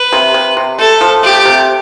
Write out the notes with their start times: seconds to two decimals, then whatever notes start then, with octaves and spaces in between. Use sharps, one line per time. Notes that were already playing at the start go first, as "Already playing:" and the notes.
Already playing: B4
0.12 C3
0.34 C3
0.57 C3
0.79 A3 A4
1.01 F3
1.23 A3 G4
1.45 C3